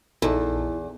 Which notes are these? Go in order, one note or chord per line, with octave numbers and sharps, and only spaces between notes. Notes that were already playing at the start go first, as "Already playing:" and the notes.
A#1 E2 D#4 E4 A4